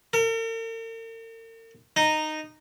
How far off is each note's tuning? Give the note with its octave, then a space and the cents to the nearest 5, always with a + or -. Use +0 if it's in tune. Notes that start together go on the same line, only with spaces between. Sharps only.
A#4 -45
D#4 -10